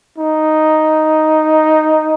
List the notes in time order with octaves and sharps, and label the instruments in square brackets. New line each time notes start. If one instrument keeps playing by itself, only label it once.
[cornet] D#4